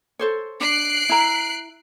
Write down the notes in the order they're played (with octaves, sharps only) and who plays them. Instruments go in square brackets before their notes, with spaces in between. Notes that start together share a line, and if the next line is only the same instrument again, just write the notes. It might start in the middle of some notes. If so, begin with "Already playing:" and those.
[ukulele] A4 C5 C#5
[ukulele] D4 [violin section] F#6 C7 D7
[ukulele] E4 A#5